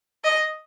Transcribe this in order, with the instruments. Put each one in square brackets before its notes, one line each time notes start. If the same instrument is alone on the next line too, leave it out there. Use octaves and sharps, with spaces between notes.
[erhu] D#5